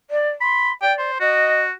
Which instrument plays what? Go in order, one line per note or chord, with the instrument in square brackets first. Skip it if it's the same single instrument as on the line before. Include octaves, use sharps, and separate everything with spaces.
[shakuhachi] D5
[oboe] B5 [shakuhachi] C6
[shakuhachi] D5 [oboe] G5
[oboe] C5
[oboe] F#4 [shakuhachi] D#5